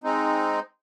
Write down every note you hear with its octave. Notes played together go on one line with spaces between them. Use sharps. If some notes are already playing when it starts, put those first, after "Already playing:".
G#3 C4 D#4